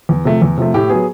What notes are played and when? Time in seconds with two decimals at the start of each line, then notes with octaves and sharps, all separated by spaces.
0.09 E2
0.25 C3 F3 A3
0.42 E2
0.58 C3 F3 A3
0.74 A2 G4
0.90 F#3 B3 G#4